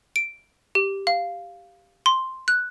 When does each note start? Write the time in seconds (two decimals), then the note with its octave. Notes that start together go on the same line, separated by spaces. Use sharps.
0.16 D7
0.75 G4
1.07 F5
2.06 C6
2.48 F#6